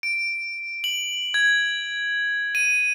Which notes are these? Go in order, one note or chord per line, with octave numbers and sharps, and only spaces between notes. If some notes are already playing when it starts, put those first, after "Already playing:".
D7
F#7
G#6
D#7